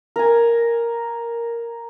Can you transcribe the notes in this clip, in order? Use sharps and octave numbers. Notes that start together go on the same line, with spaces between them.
A#4 G#5